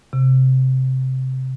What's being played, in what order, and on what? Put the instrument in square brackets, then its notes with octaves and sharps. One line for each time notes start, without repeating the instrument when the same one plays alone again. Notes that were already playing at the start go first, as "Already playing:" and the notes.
[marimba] C3